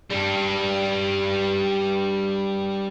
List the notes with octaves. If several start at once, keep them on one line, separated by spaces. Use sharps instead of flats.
G3 D4